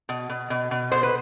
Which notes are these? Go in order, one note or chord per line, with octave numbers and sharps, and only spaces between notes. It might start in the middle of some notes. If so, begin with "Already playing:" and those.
B2
B2
B2
B2
B2 C5
B4